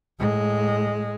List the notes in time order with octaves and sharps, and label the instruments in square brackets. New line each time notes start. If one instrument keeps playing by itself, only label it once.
[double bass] A2 G#3